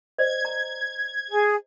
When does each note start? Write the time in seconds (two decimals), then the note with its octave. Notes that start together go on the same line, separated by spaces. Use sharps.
0.18 C5 D5 D#5 G#6
0.45 A#5
1.30 G#4